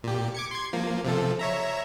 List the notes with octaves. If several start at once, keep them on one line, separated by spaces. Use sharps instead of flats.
A#2 G4
D6 G#6 C#7
C6 G#6
F3 A#3
C3 F3 A4
C#5 E5 A#5